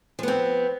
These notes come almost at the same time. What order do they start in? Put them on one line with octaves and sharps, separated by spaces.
F3 B3 C4